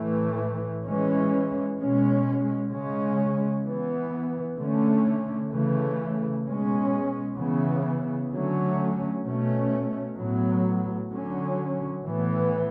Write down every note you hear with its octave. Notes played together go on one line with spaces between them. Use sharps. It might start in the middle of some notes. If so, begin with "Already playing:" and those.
Already playing: A2 E3 A3
E3 G#3 C#4
B2 G#3 C#4
C#3 G#3 C#4
E3 B3
D3 A3 C#4
C#3 E3 A3
B2 G#3 C#4
C#3 E3 B3
D3 F#3 A3 C#4
B2 A3 C#4
A2 F#3 B3
D3 F#3 C#4
A2 E3 B3